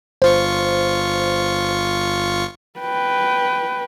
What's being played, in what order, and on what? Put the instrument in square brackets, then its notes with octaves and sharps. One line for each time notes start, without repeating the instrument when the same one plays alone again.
[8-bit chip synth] G1 F4 C#6 [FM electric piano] C5
[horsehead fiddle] B4 G5